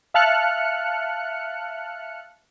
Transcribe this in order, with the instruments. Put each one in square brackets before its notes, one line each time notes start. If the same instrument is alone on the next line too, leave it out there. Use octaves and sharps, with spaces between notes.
[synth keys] E5 F5 A5 F6 F#6 C#7